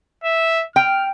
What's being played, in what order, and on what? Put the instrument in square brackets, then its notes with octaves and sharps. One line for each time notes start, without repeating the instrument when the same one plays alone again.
[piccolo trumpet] E5
[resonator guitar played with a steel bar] G5 [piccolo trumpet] F6